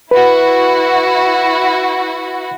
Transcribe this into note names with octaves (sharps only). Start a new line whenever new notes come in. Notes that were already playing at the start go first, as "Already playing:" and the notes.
E4 F#4 B4